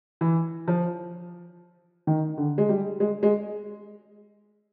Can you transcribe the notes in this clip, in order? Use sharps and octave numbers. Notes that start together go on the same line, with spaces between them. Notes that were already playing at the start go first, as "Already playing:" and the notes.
E3
F3
D#3
D3
G#3
G3
G#3
G#3